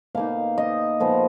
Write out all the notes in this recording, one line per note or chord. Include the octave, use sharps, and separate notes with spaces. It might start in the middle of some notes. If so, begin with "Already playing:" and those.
B2 A#3 D#4 F5
D#5
A#2 F3 B3